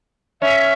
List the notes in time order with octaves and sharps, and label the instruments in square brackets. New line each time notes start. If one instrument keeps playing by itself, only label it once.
[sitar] C#4 [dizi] E5